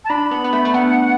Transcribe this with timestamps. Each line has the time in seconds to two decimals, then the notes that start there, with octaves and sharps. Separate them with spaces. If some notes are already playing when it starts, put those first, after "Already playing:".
0.04 A5
0.09 D4 B5
0.31 B3
0.44 B3
0.53 A3
0.65 A3
0.74 B3 F#5